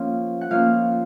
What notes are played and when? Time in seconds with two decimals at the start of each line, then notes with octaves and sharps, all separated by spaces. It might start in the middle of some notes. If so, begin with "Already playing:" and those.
Already playing: F3 A#3 C#4 F5
0.41 F#5
0.50 F3 A#3 C#4 F5